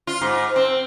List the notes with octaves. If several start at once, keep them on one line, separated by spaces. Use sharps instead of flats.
F4
G#2
C4